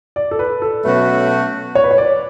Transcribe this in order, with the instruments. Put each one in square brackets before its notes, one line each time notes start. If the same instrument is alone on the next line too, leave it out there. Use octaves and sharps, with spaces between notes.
[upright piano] D5
A4
B4
A4
[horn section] B2 F#3 A3 C#4 F#4 [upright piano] B4
[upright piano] C#5
B4
C#5
D5